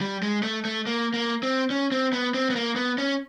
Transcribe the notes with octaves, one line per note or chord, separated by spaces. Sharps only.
G3
G#3
A3
A3
A#3
A#3
C4
C#4
C4
B3
C4
B3
A#3
B3
C#4